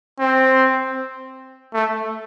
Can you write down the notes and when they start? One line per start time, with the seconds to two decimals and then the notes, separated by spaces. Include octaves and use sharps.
0.20 C4
1.73 A3